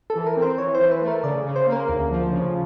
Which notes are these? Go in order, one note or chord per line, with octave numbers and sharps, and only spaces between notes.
A4
E3
A#4
C4
C5
E3 C#5
C5
E3
B4
A3
A#4
C#3 D5
C#3
C5
A#3
A#4
D2
F3
C#3